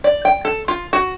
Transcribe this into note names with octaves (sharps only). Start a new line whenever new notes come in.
D5
G5
A4
F4
F#4